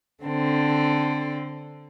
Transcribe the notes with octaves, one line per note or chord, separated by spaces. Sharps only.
D3 C4 A4